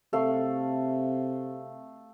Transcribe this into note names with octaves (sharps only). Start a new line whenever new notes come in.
C3 A3 F5